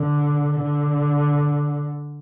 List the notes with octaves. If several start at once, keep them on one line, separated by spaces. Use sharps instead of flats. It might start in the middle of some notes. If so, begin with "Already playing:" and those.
Already playing: D3
D3